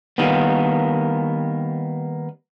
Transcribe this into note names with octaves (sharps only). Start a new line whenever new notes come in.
D#3 G3 A#3 B3